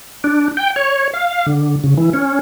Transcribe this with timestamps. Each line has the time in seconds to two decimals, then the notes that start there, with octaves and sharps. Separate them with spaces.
0.24 D4
0.57 G5
0.76 C#5
1.14 F5
1.46 D3
1.84 C#3
1.98 E3
2.14 C#4